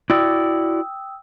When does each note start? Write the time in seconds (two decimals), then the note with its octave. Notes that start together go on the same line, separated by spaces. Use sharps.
0.10 E4 F#4 D5 G5 D#6 E6